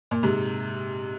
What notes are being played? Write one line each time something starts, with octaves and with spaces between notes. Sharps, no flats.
A#2
G#2 C3